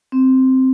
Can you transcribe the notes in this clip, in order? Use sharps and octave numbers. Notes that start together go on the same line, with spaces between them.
C4